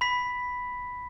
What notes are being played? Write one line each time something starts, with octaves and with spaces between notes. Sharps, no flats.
B5 B6